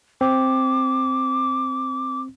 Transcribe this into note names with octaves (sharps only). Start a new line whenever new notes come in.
C4 D6